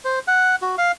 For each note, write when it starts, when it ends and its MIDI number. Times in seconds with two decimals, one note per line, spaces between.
0.05 0.19 72
0.28 0.56 78
0.62 0.76 66
0.78 0.92 77